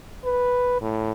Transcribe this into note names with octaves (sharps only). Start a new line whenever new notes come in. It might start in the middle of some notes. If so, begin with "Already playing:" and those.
B4
A2